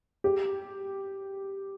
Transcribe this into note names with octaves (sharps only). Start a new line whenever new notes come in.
G4